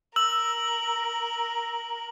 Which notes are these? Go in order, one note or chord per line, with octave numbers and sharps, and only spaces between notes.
A#4 E6 F#7